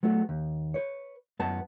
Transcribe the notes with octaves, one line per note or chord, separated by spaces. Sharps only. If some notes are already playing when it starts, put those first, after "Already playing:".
F#3 A3 B3 F#4
D#2
B4 C#5
F#2 B3 A5